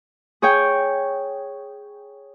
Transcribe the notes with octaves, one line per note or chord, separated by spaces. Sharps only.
G#4 C#5 G5